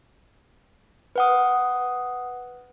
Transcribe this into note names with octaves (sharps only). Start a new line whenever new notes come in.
B4 F#5 D#6